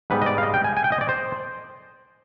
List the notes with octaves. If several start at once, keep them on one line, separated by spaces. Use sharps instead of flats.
G#2 G3 B3 B4
D#5
D5
F5
D#5
G5
G#5
G#5
G5
D#5
D5
C5